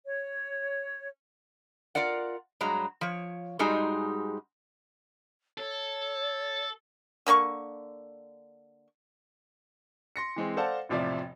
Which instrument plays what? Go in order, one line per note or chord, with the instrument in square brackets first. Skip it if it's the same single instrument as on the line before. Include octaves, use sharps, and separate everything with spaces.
[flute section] C#5
[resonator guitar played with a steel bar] F4 A#4 D5 F#5
G2 F#3 G#3 A#5
F3 C#5
G#2 G3 G#3 D#4 F#4 G#4
[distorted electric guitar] A4 [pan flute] C#5
[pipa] D3 A#3 D5 C#6
[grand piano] C6 A#6 C#7
E3 G#3 C4
A4 C5 D5 F5 F#5 A5
E1 A1 C3 F3 D5 E5